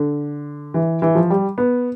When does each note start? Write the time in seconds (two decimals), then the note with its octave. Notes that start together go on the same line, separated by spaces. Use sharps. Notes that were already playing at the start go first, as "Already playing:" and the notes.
Already playing: D3
0.74 E3
1.02 E3
1.15 F3
1.30 G3
1.58 B3